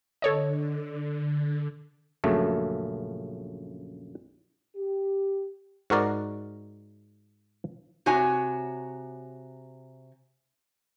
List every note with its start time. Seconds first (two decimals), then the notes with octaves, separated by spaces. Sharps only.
0.22 D3 A4 C#5 D#5
2.24 A#1 F#2 C#3 A3
4.76 G4
5.90 G#2 F#4 A#4 D5
8.06 C3 F#4 C#5 G#5